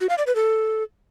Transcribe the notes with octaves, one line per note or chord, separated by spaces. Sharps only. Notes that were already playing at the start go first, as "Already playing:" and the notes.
F#4
F5
D5
B4
A4